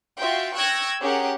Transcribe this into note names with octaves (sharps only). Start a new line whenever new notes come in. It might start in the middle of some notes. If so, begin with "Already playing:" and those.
F4 F#4 E5 G5
G5 C#6 E6 F#6 G#6 A#6
C#4 G4 G#4 A#4 F#5